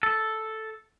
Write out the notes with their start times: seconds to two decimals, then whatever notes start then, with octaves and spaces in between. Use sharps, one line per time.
0.03 A4